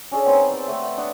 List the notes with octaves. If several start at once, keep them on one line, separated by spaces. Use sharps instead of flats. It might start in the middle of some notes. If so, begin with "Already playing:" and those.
C#4 D4 G#4 A4
B3 C4 D#4 C#5
D5 A5
A3 B3 C4
D5 E5 F#5
D4 D#5 F#5 C#6